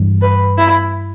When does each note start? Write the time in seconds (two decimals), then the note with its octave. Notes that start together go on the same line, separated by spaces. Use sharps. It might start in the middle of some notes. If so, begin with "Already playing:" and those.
Already playing: G2 E3 G3
0.22 B4
0.58 E4